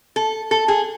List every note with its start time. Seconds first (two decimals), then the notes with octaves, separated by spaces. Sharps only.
0.16 A4
0.51 A4
0.68 G#4